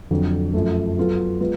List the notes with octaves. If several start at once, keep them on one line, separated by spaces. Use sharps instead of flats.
F2 D3 F#3
F#2 F3 A3
F#3 B3 F4 A4
G#3 B3 F4